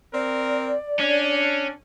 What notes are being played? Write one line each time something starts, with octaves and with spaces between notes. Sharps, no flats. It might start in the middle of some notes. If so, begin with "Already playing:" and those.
C4 A#4 D5
C#4 D4